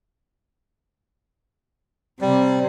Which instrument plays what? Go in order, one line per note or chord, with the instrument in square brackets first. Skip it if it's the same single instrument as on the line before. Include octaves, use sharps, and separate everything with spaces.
[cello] C3 [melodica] G3